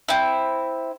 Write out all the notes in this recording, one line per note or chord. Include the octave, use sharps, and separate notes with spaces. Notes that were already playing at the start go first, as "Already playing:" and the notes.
C4 E4